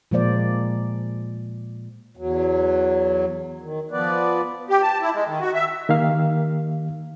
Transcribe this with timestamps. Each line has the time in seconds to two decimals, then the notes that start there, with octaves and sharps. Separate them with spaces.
0.11 A#2 F3 G#3 A#3 C5 D5
2.17 E2 F#3
3.62 D#3
3.91 F3 B3 B4 D5
4.70 G4
4.82 A5
5.02 E4
5.14 G#3
5.27 D#3
5.40 F#4
5.54 E5
5.89 D#3 A#3 G4 F5